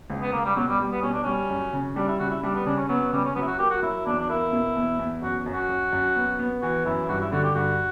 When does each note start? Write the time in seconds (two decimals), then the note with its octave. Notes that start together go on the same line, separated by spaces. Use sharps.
0.10 C#2
0.22 B3
0.32 C#2 A#3
0.45 G3
0.56 B2 F#3
0.69 G3
0.80 G3
0.92 B3
1.02 B2 C#4
1.13 D4
1.24 G3 C#4
1.50 F#2
1.73 C#3
1.96 G3 D4
2.08 E4
2.19 C#3 F#4
2.31 E4
2.43 G3 D4
2.55 B3
2.66 C#3 D4
2.77 C#4
2.89 F#3 B3
3.12 C#3 G3
3.25 C#4
3.35 F#3 B3
3.42 E4
3.47 F#4
3.59 A#3 G4
3.70 F#4
3.83 F#3 E4
4.06 E2 D4
4.19 D4
4.30 A#3 E4
4.53 B2
4.76 E2
4.99 E2
5.22 F#2 F#4
5.46 F#2
5.54 F#4
5.69 F#2
5.93 F#2
6.16 B3
6.39 B3
6.62 E3 F#4
6.85 F#2 E4
7.09 G2 F#4
7.21 E4
7.32 D3 F#4
7.44 G4
7.55 G2 F#4